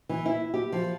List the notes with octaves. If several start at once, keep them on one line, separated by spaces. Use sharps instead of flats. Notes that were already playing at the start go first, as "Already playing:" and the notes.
E3
E4
G4
F3